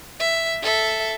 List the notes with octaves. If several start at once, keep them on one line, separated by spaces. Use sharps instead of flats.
E5
A4 E5